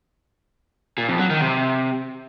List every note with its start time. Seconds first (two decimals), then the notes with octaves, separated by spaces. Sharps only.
0.98 A#2
1.09 F2
1.19 F#3
1.30 D#3
1.41 C3